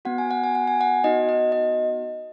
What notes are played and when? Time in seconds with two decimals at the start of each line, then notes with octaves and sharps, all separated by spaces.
0.05 B3 F#4 F#5
0.18 G#5
0.31 F#5
0.44 G#5
0.55 F#5
0.68 G#5
0.81 F#5
1.04 B3 D#4 F#4 D#5
1.29 D#5
1.52 D#5